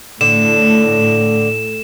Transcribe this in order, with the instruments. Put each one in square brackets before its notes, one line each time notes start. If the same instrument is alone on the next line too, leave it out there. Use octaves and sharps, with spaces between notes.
[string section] A2 [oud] D3 [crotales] E7